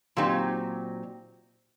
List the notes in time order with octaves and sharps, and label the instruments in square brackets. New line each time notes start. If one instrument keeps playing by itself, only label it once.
[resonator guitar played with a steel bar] A#2 F#3 C4 D#4 G4